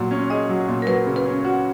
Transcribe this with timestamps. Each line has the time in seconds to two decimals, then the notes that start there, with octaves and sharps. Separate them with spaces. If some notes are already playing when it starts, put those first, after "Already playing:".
Already playing: A#2 F#3
0.11 C#4
0.30 G#4 D#5
0.49 F#3
0.68 A#2
0.82 A#4
0.87 F#3 B4
1.07 C#3
1.16 B4
1.26 C#4
1.44 F#4